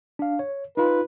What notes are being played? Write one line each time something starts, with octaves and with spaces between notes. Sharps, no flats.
D4 F5
C#5
D#4 F4 B4